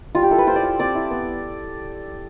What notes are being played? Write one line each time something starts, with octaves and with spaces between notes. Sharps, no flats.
G3 F4
G4
E4 A4
B4
F4 C5
D5
F4
C4 D5
E4
B3